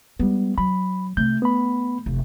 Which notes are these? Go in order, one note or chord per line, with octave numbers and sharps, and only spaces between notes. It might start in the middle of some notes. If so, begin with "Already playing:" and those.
G3 G#3 B3
F#3 B5
C3 A3 G6
B3 B5
F1